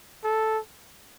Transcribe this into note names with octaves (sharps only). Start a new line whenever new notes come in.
A4